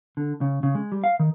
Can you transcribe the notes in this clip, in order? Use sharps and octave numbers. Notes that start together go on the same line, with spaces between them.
D3
C#3
C#3
G#3
G3
F5
D#3